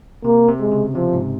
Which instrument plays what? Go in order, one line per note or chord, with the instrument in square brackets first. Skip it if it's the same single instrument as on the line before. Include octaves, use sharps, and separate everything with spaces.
[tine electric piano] C3 [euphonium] A#3
[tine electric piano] C3
[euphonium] G#3
[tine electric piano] C#3
[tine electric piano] C3 [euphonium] F3
[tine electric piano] G#2